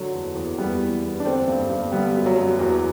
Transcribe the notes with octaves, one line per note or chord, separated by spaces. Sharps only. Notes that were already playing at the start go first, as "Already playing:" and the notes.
Already playing: D3 F#3 A3
E2
E2
E2 G3 B3
E3
E2
D4
D3 A3 C4
G2
G2
D3 G3 B3
F#2
F#3
F#2
E2 F#3